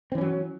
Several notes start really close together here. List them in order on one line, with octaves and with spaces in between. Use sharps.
C4 E3 C#4 F#3